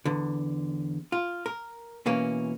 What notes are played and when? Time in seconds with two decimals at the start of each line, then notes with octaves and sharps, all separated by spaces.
0.05 E2 D3
1.12 F4
1.46 A#4
2.06 B2 E3 A#3 C#4